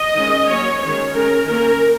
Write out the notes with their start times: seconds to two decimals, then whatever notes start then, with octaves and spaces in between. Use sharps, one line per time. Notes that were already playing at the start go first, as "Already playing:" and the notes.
Already playing: D#5
0.16 D#3 G#3 C#4
0.49 F#3 A#3 C#4 C#5
0.82 D#3 G#3 C#4 C#5
1.15 D#3 G#3 C#4 A#4
1.48 D#3 A#3 C#4 A#4